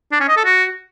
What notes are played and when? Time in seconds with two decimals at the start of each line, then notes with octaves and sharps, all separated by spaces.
0.12 D4
0.20 C#4
0.28 D#5
0.37 A4
0.45 F#4